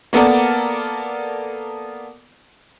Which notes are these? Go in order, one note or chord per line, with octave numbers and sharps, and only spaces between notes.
A#3 B3 A4 A#4 D5